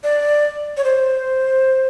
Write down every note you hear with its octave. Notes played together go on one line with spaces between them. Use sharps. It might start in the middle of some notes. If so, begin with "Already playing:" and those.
D5
C#5
C5